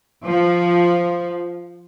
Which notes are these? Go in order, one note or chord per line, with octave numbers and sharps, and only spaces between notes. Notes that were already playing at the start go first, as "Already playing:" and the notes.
F3